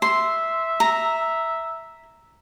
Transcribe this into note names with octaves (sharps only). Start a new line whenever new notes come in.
E5 C6
A#5